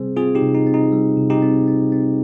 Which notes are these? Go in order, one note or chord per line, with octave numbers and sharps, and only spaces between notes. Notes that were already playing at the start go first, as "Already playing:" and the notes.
Already playing: C3 G3 C4 G#4 C5
C4 F4 G#4
D#4 G4
C3
D#4
C4
D#4
G3
C3
D#4 G4
C4
C4
C4